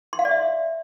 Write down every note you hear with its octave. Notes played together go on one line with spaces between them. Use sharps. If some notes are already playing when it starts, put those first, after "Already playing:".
C6
F5
D5
E5